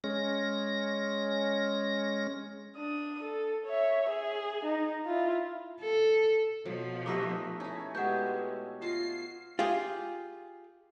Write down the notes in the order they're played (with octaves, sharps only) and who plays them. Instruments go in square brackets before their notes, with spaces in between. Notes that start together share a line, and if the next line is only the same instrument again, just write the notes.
[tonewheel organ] G#3 C#4 A#6
[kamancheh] D4 D#6
A4
C#5 E5
G#4
D#4
E4 F4
[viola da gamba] A4
[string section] B2 F3 [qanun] F#3
[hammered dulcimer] A3 D#4 E5 [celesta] G4 D6 [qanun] G#4 B4 D#5
[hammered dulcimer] C#4 [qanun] E4 G#4
[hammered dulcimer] B2 [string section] G#3 [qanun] G4 E5 [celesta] F#5 G6
[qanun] F4 D#5 A5 [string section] C7
[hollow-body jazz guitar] F4 G4 G#4